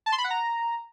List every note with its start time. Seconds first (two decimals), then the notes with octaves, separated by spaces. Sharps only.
0.06 A5
0.12 C6
0.18 B5
0.24 F#5
0.30 A#5